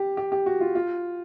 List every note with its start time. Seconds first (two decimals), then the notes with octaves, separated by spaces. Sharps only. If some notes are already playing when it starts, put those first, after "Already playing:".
Already playing: G4
0.17 G4
0.32 G4
0.46 F#4
0.61 F4
0.75 F4